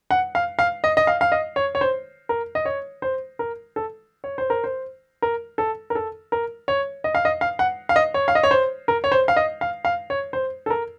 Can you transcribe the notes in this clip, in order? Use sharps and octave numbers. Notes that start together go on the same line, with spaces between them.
F#5
F5
F5
D#5
D#5
F5
F5
D#5
C#5
C#5
C5
A#4
D#5
C#5
C5
A#4
A4
C#5
C5
A#4
C5
A#4
A4
A#4
A4
A#4
C#5
D#5
F5
D#5
F5
F#5
F5
D#5
C#5
F5
D#5
C#5
C5
A#4
C#5
C5
F5
D#5
F5
F5
C#5
C5
A4
A#4